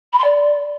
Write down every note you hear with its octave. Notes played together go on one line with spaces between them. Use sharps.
B5
C6
D5